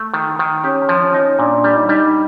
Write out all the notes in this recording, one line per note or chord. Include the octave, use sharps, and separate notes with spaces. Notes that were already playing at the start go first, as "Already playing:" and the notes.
Already playing: A3
D#3
D#3
C#4 G4
F3
C#4
D#4
A#2 D4
G3
D#4
G3